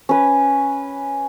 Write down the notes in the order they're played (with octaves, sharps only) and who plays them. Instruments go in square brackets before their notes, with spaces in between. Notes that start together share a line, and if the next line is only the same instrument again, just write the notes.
[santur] C#4 B4